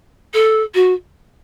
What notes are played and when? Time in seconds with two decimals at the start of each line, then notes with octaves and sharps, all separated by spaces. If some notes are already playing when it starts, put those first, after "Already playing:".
0.34 A4
0.74 F#4